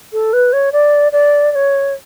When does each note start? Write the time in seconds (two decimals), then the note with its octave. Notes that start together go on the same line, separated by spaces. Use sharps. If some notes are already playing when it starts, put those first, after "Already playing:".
0.13 A4
0.33 B4
0.53 C#5
0.72 D5
1.12 D5
1.52 D5
1.55 C#5